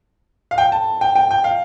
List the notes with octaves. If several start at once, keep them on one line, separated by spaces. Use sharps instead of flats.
F5
G5
A5
G5
G5
G5
F5